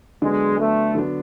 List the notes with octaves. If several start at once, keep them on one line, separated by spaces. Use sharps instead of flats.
D3 F#3 G#3 B3 D4
A3
D3 F#3 B3 D4